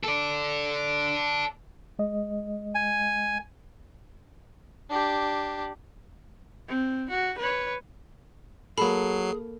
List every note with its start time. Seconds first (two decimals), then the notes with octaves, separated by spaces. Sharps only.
0.04 A4 D5
1.99 G#3 D#5
2.75 G#5
4.90 D4 G4
6.68 C4
7.10 F#4
7.39 B4 C#5
8.78 F#3 A#3 G#4 A4 B5 C7